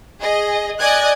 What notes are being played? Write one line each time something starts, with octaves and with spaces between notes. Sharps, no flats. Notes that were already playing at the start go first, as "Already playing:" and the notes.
G#4 D#5
D5 D#5 G#5 F#6 G#6